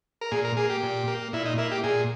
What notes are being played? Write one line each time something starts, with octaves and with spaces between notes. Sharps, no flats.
A#4
A#2 G#4
A#4
A#3 G#4
G4
A#2
A#3
A#2 E4
D#4
A#3 E4
G4
A#2 G#4